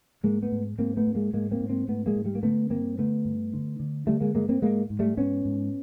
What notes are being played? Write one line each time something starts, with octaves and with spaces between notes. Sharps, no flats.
G#2 G#3 A#3
A3 B3
G#2
G#2 A#3 C4
A3 B3
G#2
G#3 A#3
G#2 G#3 A#3
A#3 C4
G#2
A#3 C4
G#2 A3 B3
G#3 A#3
G#2
G3 A3
A#3
D3 A3 B3
G2 A#3 C4
D3 A3 B3
G2
D3
D3
D3 G3 A3
G#3 A#3
G2 G#3 A#3
A#3 C4
G#2 G#3 A#3
G#2
G3 A3
G#2 B3 C#4
G#2